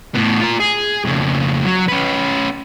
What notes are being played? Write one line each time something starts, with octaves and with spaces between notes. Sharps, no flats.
A2 B3
F4 A#4
G#4
F2 C#3
F#3
C#4 B4